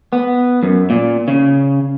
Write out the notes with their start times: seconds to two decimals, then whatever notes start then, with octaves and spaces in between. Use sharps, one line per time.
0.13 B3
0.63 F#2
0.90 A#2
1.28 C#3